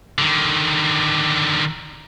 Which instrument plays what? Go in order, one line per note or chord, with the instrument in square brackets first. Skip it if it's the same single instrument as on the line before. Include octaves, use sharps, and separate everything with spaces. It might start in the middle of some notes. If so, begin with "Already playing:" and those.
[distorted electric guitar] D3 D#3